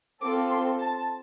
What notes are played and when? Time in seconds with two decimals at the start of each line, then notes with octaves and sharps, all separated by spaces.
0.21 C4 F4 A4 D6
0.50 C6
0.79 A5